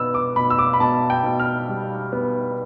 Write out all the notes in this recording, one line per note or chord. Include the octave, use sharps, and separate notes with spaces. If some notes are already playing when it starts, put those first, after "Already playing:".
Already playing: B2 B3 E6
D6
B2 B5
E6
D6
B5
B2 A5
G5
B2
F6
G3
B3